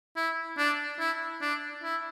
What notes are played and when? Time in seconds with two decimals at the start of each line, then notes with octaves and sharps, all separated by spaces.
0.16 E4
0.58 D4
0.99 E4
1.42 D4
1.83 E4